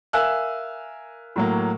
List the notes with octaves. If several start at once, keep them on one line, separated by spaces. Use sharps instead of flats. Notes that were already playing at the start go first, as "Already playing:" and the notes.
A#4 E5 F5 G#5 E6 F#6
A2 F#3 A#3